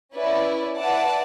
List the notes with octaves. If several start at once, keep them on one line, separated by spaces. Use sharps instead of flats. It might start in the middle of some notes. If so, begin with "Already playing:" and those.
C#4 E4 B4 D5
E4 B4 D5 F#5 A5